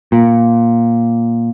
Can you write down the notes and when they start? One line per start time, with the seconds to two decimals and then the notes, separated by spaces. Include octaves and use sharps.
0.12 A#2